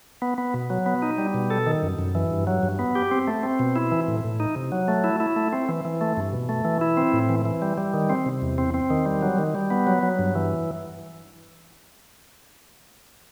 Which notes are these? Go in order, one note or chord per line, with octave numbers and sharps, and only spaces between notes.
B3
B3
B2
F#3
B3
D#4
G3
B2
A4
D#3
F#2
F#2
E3
G2
F#3
G2
B3
G4
C4
A3
C4
B2
E4
E3
A2
A2
D#4
C3
F#3
A3
E4
E4
A3
C4
E3
E3
A3
G2
B2
A3
E3
E4
C4
A2
E3
E3
G3
G3
D#3
C4
C3
E2
C4
C4
D#3
G3
F#3
D#3
G3
B3
F#3
F#3
G2
E3